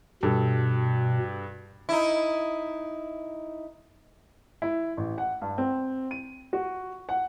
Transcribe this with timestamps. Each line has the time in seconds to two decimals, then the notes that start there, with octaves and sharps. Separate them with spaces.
0.23 G2 B2 A4
1.89 D#4 E4
4.62 E4
4.97 A1
5.18 F#5
5.41 G2
5.58 C4
6.11 D#7
6.53 F#4
7.09 F#5